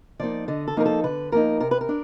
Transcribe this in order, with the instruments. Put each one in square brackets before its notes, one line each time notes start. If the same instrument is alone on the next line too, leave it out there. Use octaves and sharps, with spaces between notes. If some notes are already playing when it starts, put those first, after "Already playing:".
[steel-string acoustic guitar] F3 A#3 D#4 D5
D3 D#5
A4
F3 A#3 D#4 A#4
A4
D3 B4
F3 A#3 D#4 A#4
C3 A#4
B4
A#4
D4